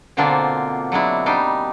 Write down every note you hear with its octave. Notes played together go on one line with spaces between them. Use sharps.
B2 D3 A#3 C4 D4 F4
F#3 G#3 D4 E4
G3 D4 D#4 G4